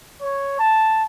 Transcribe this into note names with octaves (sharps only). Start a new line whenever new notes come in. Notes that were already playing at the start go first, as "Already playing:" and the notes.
C#5
A5